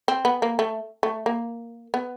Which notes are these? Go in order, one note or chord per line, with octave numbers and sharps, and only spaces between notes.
C4
B3
A#3
A3
A3
A#3
B3